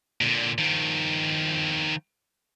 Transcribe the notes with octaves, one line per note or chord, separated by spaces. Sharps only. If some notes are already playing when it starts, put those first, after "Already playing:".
A#2 D3
D#3 F3